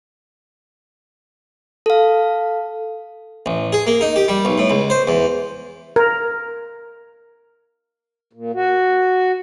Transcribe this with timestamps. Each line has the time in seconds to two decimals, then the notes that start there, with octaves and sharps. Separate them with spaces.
1.86 A4 F5
3.46 A1
3.73 G#4
3.87 A#3
4.01 D#4
4.16 G4
4.28 G3
4.45 B1
4.58 A2
4.70 C#2
4.90 C5
5.08 E2
5.96 A#4
8.33 A#2
8.55 F#4